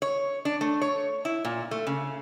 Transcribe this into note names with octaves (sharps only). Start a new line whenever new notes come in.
C#5
D4
A3
C#5
E4
A#2
A3
C#3